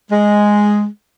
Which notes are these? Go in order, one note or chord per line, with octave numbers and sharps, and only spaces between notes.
G#3